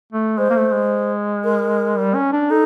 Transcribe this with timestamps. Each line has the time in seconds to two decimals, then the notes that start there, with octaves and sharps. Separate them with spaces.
0.12 A3
0.38 G#3 C5
0.50 A#3
0.56 A3
0.74 G#3
1.45 A#4
1.97 G3
2.15 C#4
2.32 D4
2.50 D#4 A4